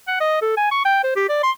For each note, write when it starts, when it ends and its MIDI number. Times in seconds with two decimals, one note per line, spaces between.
0.08 0.18 78
0.20 0.41 75
0.42 0.52 69
0.57 0.68 80
0.71 0.85 85
0.85 0.99 79
1.04 1.15 72
1.16 1.28 67
1.29 1.40 74
1.43 1.51 84